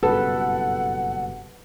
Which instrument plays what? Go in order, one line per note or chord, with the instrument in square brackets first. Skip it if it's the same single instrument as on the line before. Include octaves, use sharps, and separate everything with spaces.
[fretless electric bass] F#1 G2 B2 [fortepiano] A4 [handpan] B4 [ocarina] F#5